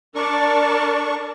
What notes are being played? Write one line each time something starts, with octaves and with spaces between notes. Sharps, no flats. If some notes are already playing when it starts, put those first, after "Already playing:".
D4 A#4 D5 A5 C#6